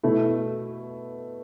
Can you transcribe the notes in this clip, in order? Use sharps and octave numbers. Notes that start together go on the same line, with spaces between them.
B2 A3 E4